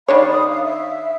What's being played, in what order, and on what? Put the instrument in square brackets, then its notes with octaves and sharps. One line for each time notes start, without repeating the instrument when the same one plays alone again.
[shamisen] D#3 D4 C#5 [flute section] D5 F5 B5
[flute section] D#6
F5
E5